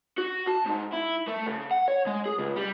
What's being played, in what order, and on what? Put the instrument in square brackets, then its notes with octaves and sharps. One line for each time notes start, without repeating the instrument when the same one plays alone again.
[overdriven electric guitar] F#4
A5
G#2
E4
A3
C#3
F#5
C#5
G#3
G#4
C#2
G3